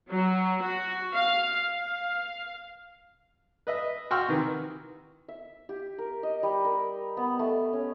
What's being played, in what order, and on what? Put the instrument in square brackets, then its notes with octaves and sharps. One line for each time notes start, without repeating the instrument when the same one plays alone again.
[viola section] F#3
F#4
F5
F5
[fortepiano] B4 D#5 E5
F#4 G5 C6 C#6 E6 F6
C3 D#3 E3
[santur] E5
G4
A#4
D#5
G3
A#4
B3
A3
C#4